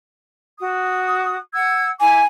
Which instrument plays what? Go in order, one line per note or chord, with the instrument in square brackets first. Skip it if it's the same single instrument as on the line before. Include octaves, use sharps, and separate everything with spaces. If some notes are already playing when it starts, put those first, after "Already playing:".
[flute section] F#4 D#6
F#5 E6 G#6
[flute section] E4 D6 [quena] G#5